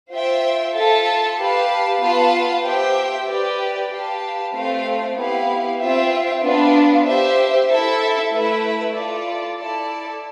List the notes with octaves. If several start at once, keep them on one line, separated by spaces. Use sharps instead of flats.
F4 C5 E5 G5
F4 A4 E5 A5
G4 B4 F5 A5
B3 F4 B4 F5 A5
G4 C5 E5 G5
G4 B4 D5
G4 B4 F5 A5
A3 C4 F4 C5 F5
B3 E4 G4 B4 F5
C4 F4 C5 E5 G5
B3 D4 F4 B4
G4 C5 E5
E4 A4 E5
A3 E4 B4 E5
F4 A4 D5
E4 A4 D5 A5